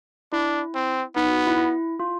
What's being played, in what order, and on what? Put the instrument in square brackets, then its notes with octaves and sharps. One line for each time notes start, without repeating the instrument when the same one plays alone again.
[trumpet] D4 [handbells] E4
[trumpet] C4
[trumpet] B3 [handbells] D#4
[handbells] F#4
E4
E4
F4